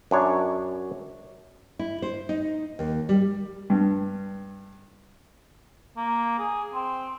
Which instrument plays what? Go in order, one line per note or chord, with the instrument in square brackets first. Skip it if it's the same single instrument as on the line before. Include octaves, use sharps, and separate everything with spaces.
[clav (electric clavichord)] F#2 D4 C#5
[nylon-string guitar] E4
C5
D#4
D#2
G3
[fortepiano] G2
[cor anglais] A#3
G#4
C4